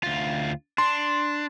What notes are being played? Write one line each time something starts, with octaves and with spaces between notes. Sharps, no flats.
D2 F4
D4 C6